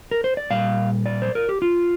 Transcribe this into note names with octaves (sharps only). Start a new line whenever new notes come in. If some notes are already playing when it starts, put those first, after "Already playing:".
A#4
C5
D5
A#2 G3 F5
D5
C5
A#4
G4
F4